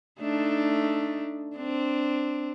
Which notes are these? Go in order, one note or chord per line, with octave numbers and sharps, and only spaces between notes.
A3 D4 D#4
C4 D4